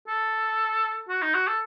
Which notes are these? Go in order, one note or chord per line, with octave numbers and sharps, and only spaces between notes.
A4
F#4
D#4
F#4
A4